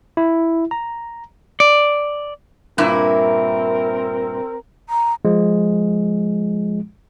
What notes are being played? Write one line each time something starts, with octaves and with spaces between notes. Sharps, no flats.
E4
A#5
D5
G2 A#2 C4 E4 A#4
A#5
F3 G#3